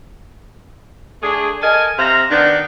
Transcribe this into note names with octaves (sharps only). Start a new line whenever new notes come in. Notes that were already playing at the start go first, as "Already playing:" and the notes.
A3 D4 G#4
A4 A#4 D#5 G#5
C3 C5 E5 F5 A#5
D#3 B3 D4